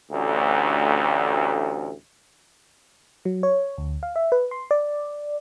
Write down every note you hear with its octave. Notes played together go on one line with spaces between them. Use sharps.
A1 D2
F#3
C#5
D2
F5
E5
B4
C6
D5